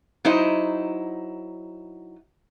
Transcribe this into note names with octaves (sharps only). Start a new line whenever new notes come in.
F#3 D#4 E4 C5 D#5